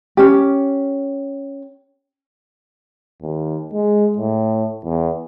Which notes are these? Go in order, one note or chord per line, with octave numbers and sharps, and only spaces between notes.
C#4 G4
D#2
G#3
A2
E2